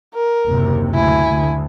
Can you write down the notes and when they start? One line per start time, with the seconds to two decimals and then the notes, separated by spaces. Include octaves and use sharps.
0.15 A#4
0.46 F#1 D#2 C3
0.94 D2 E4 G#5
1.30 D2